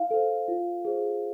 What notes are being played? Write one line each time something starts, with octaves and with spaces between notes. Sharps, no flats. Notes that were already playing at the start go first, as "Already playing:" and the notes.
Already playing: E4 F5
A4 C5
F4
G#4 C5